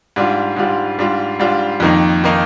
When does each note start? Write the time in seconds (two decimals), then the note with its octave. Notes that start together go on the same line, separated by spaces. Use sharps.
0.16 G#2 G3 D4 F4
0.56 G#2 G3 D4 F4
0.99 G#2 G3 D4 F4
1.39 G#2 G3 D4 F4
1.80 F2 D#3 A#3 D#4
2.24 D#3 A#3 D#4